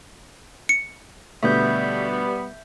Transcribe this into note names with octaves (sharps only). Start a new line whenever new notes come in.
C#7
B2 D3 G3 A3 B3 E5 G6